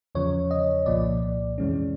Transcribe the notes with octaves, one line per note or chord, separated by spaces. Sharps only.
E2 C#3 F3 C#5
D#5
C2 A#2 F3 A#3 D5
F2 C3 E3 G#3 C#4